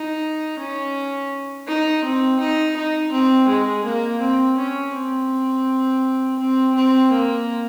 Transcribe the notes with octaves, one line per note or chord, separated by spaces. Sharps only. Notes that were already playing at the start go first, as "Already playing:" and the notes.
Already playing: D#4
C#4
D#4
C4
D#4
D#4
C4
G#3
A#3
C4
C#4
C4
C4
C4
A#3